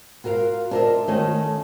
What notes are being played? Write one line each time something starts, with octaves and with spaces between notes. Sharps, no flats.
F4 F#4 A#4 E5 F5
D4 F4 A#4 C#5 D#5 E5
D#3 A3 C#4 F4 C#5 D#5